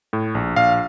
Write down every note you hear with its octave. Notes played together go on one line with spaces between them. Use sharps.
A2
A#1
A#1 F5